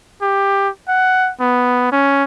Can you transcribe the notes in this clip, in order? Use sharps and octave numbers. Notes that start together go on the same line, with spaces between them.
G4
F#5
B3
C#4